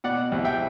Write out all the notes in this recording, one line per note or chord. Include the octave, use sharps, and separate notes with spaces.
B2 D5 F#5
C2
E5 G5